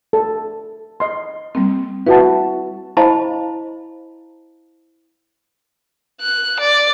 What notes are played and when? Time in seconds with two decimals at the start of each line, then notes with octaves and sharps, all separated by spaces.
0.13 A4
1.00 D#5 C6
1.55 G3 A#3 C4
2.07 E4 F#4 B4 A5
2.97 E4 C5 D#5 F5 A5 B5
6.21 F#6
6.60 D5